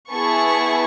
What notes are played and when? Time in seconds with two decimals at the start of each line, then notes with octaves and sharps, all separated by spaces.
0.11 B3 E4 G#4 A5 C#6